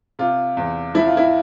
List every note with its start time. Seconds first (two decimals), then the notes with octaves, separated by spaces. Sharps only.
0.19 C3 F4
0.57 E2
0.95 F3 E4
1.06 F4
1.17 E4